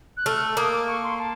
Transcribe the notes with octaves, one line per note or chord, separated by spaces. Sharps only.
F#6
A3 F6
F6
E6
A#3 D#6
D6
C#6
C6
A5